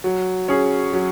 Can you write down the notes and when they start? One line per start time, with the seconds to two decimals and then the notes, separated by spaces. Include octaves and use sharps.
0.04 F#3
0.48 C#4 G#4
0.93 F#3